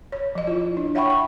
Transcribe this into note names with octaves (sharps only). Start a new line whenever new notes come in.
C#5
F3 D#5
E4 F4
D4
C#5 E5 F#5 G5 B5 C#6
C#6